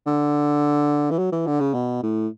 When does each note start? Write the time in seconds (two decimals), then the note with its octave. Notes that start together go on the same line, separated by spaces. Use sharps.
0.07 D3
1.11 E3
1.19 F#3
1.32 E3
1.47 D3
1.60 C#3
1.74 B2
2.03 A2